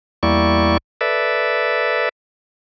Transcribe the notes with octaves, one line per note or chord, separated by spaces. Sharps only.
E2 G3 A#3 E4 D5 C#6
A4 B4 D5 E5